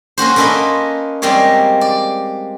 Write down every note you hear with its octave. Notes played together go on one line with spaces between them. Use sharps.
A#3 C#4 F#4 C5
A#3 C#4 F4 A4 B4 D#5
G3 G#3 A#3 C4 G4 C#5
D5